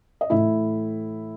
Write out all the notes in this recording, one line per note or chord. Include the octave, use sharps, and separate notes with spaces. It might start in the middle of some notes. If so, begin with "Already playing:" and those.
D#5
A2 E3 A3 E4 E5